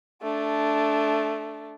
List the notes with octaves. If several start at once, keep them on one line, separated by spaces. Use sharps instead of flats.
A3 D4